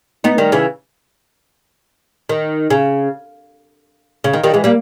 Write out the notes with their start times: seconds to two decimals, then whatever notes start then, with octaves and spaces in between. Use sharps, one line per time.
0.24 B3 D#4
0.38 D#3 G3
0.52 C#3 E3
2.29 D#3
2.70 C#3
4.24 C#3
4.33 D#3
4.43 D#3 G3
4.54 E3 G#3
4.64 G3 A#3